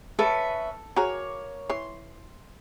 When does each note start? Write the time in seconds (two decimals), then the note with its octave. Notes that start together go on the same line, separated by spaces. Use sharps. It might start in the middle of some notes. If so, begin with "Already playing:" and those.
0.19 C#4 A4 B4 E5
0.96 A#3 F#4 G#4 C#5 A#5
1.70 E3 C#5 C6